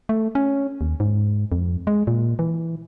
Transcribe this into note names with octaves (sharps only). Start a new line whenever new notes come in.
A3
C#4
D#2
G#2
F2
G#3
A#2
E3